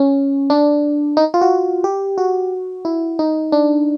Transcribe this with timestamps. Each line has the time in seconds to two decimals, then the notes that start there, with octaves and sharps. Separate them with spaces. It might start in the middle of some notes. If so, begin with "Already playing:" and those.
Already playing: C#4
0.50 D4
1.17 D#4
1.34 F4
1.41 F#4
1.84 G4
2.18 F#4
2.85 E4
3.19 D#4
3.52 D4